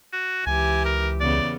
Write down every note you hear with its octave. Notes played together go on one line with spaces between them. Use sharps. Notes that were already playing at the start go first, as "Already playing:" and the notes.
F#4
C#2 E3 G4 G#5
A#4
E2 C#3 B3 D5